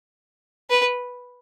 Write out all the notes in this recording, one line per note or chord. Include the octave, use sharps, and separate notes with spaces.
B4